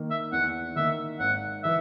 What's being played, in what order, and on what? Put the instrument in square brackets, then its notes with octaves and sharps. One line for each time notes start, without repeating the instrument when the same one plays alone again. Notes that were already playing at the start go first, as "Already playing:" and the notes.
Already playing: [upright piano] D#3 A#3
[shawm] E5
[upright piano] E2 [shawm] F#5
[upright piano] D#3 A#3 [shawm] E5
[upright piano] G#1 [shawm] F#5
[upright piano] E3 [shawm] E5